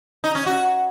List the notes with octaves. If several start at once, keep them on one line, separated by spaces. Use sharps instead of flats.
D#4
C#4
F#4